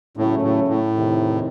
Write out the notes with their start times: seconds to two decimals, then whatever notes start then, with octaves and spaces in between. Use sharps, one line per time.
0.17 E2 A2 C#3 F#3 A3 C#4
0.42 A2
0.68 A2
0.93 E2 C3 D#3